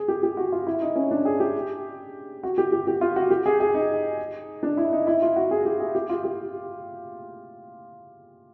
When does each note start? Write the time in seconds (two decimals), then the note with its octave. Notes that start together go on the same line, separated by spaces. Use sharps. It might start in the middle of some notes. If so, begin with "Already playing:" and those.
Already playing: G#4
0.08 G4
0.23 G4
0.37 F#4
0.52 F4
0.67 E4
0.81 D#4
0.96 C#4
1.11 D4
1.25 G#4
1.40 G4
2.43 F#4
2.58 G4
2.72 G4
2.87 G4
3.01 F4
3.16 F#4
3.30 G4
3.46 G#4
3.60 G#4
3.74 D#4
4.63 D4
4.77 E4
4.93 D#4
5.07 E4
5.22 F4
5.36 F#4
5.51 G#4
5.65 G4
5.80 G#4
5.95 G4
6.09 F4
6.24 G4